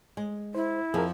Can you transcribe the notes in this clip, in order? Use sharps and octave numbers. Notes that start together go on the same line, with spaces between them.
G#3
E4 C5
F2 F3 G#4 A#4